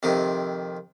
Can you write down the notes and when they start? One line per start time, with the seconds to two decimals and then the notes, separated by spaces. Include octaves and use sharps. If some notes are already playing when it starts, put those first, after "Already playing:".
0.03 F2 C3 D#3